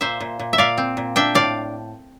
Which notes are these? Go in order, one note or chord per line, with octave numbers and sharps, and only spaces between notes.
A#2 C5 E5
A#2
A#2
E5
A#2 D5 F5
C4
A#2
D4 E5 G5
A2 D5 F5